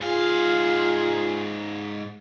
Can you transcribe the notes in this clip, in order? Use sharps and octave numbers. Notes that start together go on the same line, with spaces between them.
G#2 F4 G#4 F5